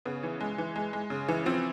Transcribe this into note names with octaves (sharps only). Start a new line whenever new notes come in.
C#3 B3
E3
G#3
E3
G#3
G#3
C#3
E3
F3 C4